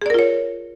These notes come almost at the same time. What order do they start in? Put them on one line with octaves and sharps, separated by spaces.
G#4 D5 A#4 F4 C#5